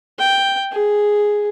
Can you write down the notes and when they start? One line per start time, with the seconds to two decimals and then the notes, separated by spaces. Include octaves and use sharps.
0.19 G5
0.71 G#4